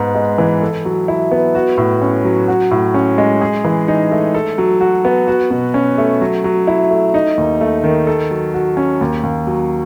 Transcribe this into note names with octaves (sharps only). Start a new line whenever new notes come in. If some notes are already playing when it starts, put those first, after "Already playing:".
Already playing: G#2 B3
G#3
E3
A4
F#3
E4
B3
F#4
A2
C#4
F#3
F#4
A2
C#4
G#3
G#4
E3
D#4
A3
A4
F#3
F#4
B3
F#4
B2
C#4
A3
F#3
F#3
E4
A3
D#4
D#2
A3
D#3
A4
F#3
F#4
C#4
D#2
D#2
F#3